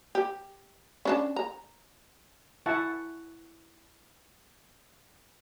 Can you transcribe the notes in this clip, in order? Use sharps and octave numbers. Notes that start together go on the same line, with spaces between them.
G4
C#4 D4 A5
A#5
E4 E5 F#5 G#5 A5 C#6